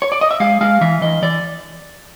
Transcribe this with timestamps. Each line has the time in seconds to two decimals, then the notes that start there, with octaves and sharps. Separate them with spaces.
0.02 C#5
0.12 D5
0.21 D#5
0.31 E5
0.40 G#3 F5
0.61 G#3 F5
0.81 E3 E5
1.01 E3 D#5
1.22 E3 D5